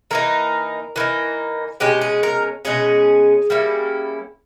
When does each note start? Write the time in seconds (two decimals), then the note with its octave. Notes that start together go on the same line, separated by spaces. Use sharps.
0.11 E3 A#3 D#4 A#4
0.96 E3 A#3 D#4
1.80 B2 G#3 C#4 G4
2.01 G#4
2.23 A#4
2.65 B2 G#3 C#4 G#4
3.50 G3 A#3 C#4 E4